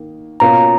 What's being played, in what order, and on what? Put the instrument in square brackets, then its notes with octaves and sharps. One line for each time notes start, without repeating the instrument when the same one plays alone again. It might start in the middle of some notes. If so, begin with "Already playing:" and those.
Already playing: [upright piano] D#3 A#3 D#4
[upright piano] B2 A#3 C#4 F4 [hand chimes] A#5